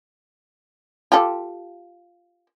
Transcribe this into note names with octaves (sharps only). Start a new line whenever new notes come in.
F4 G4 A4